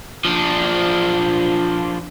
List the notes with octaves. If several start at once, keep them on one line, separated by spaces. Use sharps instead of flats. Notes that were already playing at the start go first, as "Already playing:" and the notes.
F3 D4